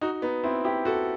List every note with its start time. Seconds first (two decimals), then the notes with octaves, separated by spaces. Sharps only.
0.01 D#4 F#4
0.22 B3 D#4
0.44 C4 E4
0.65 E4 G4
0.85 F#4 A4